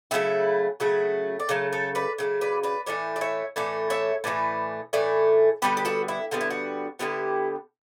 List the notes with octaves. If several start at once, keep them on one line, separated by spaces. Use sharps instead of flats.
C#3 F#3 A3 E4
C#3 F#3 A3 F#4
D5
C#3 F#3 A3 A4 C#5
A4 C#5
B4 D5
C#3 F#3 A3
B4 D5
B4 D5
A2 E3 A3 D5
D5
C#5 E5
A2 E3 A3 D5
C#5 E5
A2 E3 A3 B4 D5
A2 E3 A3 D5
D3 G3 B3 G4 B4
G4
F#4 A4
E4
D3 G3 B3 F#4
E4
F#4
D3 G3 B3 E4 G4